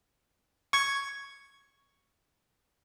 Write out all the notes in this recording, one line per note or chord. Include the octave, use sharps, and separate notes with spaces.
C#6 G#6